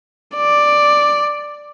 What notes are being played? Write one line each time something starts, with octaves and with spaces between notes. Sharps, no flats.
D5